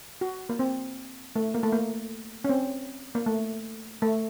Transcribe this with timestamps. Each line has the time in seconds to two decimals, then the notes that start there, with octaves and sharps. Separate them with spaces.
0.21 F#4
0.49 A#3
0.59 C4
1.36 A3
1.54 A#3
1.63 A3
1.72 A#3
2.44 C#4
2.49 C4
3.15 A#3
3.26 A3
4.02 A3